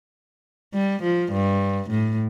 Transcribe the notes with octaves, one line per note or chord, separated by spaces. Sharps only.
G3
F3
G2
A2